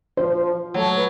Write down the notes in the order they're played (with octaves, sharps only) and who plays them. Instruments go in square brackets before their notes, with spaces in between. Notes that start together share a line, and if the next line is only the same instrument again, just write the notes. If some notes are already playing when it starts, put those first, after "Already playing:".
[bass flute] F3 [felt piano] C5
[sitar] F#3 [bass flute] A3
[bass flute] B4